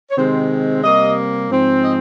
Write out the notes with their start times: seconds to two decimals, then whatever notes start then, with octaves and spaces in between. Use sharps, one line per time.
0.10 C#5
0.16 C3 D#3 G#3 C4 C5
0.83 C3 G3 A#3 D#5
1.49 G#2 F3 C4
1.83 D#5